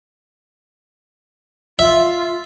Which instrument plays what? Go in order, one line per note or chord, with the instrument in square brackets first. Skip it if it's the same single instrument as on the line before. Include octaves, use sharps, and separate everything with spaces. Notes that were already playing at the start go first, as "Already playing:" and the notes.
[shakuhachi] F4 [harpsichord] E5